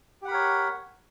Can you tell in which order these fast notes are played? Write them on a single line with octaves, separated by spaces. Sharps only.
G4 F#5 B5 A#4 C#5